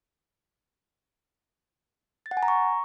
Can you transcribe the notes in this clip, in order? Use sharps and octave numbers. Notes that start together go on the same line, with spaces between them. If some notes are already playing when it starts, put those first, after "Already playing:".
A6
F#5
G#5
A#5
C#6